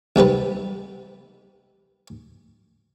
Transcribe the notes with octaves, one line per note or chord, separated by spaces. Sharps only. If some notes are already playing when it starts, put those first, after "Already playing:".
B1 C3 G3 B4